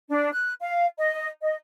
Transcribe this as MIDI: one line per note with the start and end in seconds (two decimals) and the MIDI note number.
0.10 0.31 62
0.32 0.53 90
0.61 0.85 77
0.98 1.28 75
1.43 1.56 75